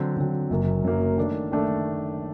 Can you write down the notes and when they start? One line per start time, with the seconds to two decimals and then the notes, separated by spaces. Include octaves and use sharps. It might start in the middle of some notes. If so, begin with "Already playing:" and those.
Already playing: D3 F#3 C4
0.17 D3 F#3 C4
0.50 F#1 F#2 F#3 A#3
0.84 F#1 F#2 F#3 A#3
1.17 D#3 A3 D4
1.52 D#3 A3 D4